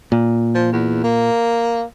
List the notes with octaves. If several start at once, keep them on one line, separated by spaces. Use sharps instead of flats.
A#2
F3
E2
A#3